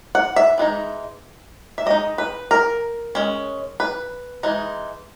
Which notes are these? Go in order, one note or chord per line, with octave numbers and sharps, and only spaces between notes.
F#5
E5
E3 G#3 B3 D#4
E5
G#3 D#4 D#5
B4
A#4
G#3 C#4
B4
E3 G#3 D#4